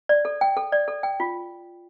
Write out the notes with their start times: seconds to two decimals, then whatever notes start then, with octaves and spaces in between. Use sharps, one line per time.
0.09 D5
0.25 A4
0.41 G5
0.57 A4
0.72 D5
0.88 A4
1.03 G5
1.20 F4